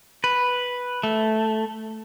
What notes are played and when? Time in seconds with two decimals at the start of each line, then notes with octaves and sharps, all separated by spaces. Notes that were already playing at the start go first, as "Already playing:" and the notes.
0.24 B4
1.03 A3